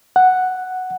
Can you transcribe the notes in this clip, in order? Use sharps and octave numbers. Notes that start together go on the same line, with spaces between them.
F#5